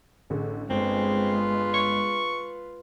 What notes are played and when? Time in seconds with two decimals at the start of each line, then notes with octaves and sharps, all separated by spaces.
0.30 A1 D3 G#4
0.70 G1 G#3 C4 F4 B4
1.74 C#6